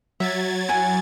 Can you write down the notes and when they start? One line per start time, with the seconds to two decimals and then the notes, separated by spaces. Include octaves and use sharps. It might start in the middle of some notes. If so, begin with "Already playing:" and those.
0.20 F#3 E5 G#6 A6
0.69 E4 F#5 G#5